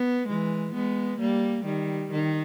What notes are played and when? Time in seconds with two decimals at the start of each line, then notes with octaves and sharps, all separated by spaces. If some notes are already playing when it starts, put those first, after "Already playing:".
Already playing: B3
0.28 E3 G#3
0.75 G#3 B3
1.19 G3 A#3
1.65 D#3 G3
2.12 D#3